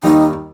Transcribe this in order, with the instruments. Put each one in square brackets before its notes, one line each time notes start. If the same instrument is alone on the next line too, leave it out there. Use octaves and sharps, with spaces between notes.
[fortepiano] D#2 D#3 G3 [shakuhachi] D#4